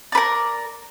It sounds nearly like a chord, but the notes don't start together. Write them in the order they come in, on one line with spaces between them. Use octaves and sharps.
D5 B4 A#4